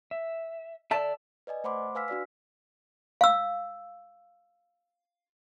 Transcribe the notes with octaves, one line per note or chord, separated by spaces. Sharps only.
E5
A4 D5 E5 A5
B4 D5 D#5 G#5
A3 C5 F#5 B5 C6 D6
B4 F5 G#5 E6 F6 B6
D4 F#4 D5 B6
F5 E6